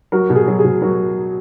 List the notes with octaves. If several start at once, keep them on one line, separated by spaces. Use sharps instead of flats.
F#3 F#4 A#4
B2
G#4
F#3
G#4
B2
F#3 F#4 A#4